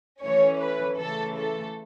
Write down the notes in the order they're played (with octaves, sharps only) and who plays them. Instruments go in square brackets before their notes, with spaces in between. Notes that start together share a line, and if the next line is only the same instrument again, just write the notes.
[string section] E3 A3 C#4 C#5
B4
C#3 E3 A3 A4
A4